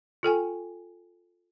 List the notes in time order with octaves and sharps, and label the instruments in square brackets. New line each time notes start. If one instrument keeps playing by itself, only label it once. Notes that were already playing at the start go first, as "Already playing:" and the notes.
[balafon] F4 A4 G5 G#5